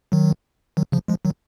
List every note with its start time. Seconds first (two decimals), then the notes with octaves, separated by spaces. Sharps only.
0.12 D#3 F#3
0.77 D#3 F#3
0.92 C#3 F3
1.08 F3 G#3
1.25 D#3 F#3